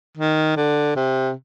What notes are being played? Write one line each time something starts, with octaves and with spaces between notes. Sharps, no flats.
D#3
D3
C3